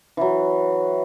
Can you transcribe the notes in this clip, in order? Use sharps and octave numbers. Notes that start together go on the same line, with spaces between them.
E3 F#3